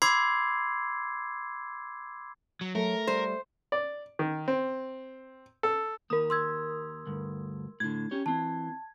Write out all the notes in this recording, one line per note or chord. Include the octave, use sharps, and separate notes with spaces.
B5 C6 D6 E6 G#6 C7
F#3
F#3 A3 A#4
G3 C5
D5
D#3
C4
A4
D#2 A#3 A#4 D#6
C6 E6 G#6
D2 G2
A2 D3 G#6
C#4 G4 C#5
E3 C4 A5